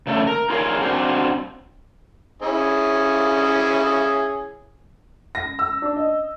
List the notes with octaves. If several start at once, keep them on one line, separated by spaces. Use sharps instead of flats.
C#3 A3 A4
A#4
D#4 F4 G#4 A#4 C#5 F5
C4 D4 F#4 C5 F5
C#4 E4 G#4
A#6
E6
D4
D#5